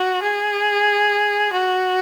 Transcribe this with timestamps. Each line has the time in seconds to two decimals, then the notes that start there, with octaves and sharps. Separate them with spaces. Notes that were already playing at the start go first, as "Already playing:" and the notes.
Already playing: F#4
0.22 G#4
1.53 F#4